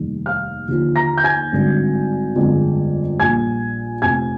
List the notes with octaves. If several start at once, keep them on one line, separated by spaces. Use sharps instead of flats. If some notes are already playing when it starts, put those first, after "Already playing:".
Already playing: F1 D#2 D#3 G3
F5 F6
D#2 D3 F3
A#5 A#6
G6
G#5 G#6
G#1 G2 D3
G1 F2 D3 G#3
A#1 A#2 G3 G#5 G#6
F1 F2 C3 G#5 G#6